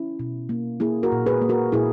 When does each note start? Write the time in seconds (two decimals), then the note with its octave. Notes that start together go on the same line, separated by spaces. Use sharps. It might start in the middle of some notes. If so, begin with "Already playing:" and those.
Already playing: C#4 E4
0.19 B2
0.49 A#3
0.80 A#3 E4 G#4
1.03 F#4 A#4
1.12 A#2
1.26 G#4 B4
1.42 A#3
1.49 F#4 A#4
1.72 A#2 E4 G#4